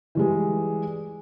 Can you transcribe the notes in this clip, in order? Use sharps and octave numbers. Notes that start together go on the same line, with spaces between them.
E3 G3 G#3